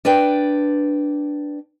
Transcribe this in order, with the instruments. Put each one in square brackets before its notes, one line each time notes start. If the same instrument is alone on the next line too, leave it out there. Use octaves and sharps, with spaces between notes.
[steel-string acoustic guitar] D4 B4 D5 G5